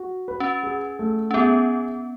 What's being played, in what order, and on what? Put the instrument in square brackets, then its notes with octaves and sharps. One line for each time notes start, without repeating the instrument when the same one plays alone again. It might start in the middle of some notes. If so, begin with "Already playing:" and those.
Already playing: [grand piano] F#4
B4
[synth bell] C#4
[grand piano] G#4
A3
[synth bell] C#4
[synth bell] B3 [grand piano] G#4